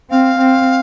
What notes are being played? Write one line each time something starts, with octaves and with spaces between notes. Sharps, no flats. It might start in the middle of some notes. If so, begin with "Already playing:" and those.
C4 F5
C4